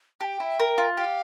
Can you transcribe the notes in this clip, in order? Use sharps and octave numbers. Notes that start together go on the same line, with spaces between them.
G4 G5 A5
E4
A#4
F4
G4 F5